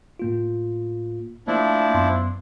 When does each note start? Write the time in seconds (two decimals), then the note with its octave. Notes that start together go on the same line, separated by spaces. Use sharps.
0.19 A2 A#3 F4
1.47 F3 A3 A#3 D4 E4
1.94 F#2 B3 C6